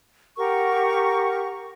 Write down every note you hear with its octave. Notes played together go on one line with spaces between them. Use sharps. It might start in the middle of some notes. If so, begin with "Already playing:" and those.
G4 A#4 F#5 C#6